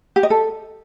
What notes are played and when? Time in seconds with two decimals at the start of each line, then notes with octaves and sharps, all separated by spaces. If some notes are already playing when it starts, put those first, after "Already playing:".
0.16 G4
0.23 D#5
0.30 A4